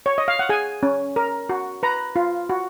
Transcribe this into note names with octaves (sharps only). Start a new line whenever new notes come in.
C#5
D#5
F5
F#5
G#4 G#5
C#4
A#4
F#4
B4 A#5
F4
F#4